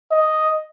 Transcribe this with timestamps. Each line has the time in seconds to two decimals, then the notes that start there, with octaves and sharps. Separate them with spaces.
0.11 D#5